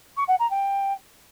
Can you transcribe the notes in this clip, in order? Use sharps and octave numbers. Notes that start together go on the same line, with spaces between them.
C#6
F#5
A#5
G5